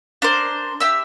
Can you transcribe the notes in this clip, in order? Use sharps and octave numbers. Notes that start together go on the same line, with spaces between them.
D4 A#4 C5
G4 E5 E6